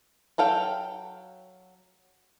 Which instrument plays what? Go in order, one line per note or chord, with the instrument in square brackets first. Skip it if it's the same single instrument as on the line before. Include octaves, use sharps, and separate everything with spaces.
[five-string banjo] F#3 A4 F5 G5